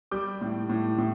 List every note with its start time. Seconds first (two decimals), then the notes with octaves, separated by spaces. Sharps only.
0.11 G3 D6 G6
0.41 A2
0.70 A2
0.98 A2